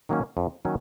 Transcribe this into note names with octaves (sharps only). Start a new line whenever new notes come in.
D#3 F#3 A#3 C#4
F2
D#3 F#3 A#3 C#4